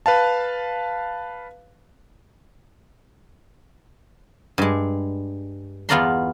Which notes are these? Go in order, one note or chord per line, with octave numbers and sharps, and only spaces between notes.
B4 F5 A5
G2 G#3
E2 B3 F4 D5 A#5 C6